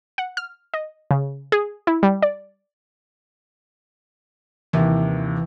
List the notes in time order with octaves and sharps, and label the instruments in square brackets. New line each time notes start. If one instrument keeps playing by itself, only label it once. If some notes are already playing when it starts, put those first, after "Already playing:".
[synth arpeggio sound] F#5
F6
D#5
C#3
G#4
E4
G3
D5
[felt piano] D#2 C3 [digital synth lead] E3